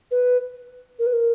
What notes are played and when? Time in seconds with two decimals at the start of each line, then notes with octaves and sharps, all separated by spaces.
0.11 B4
0.99 A#4
1.06 B4
1.13 A#4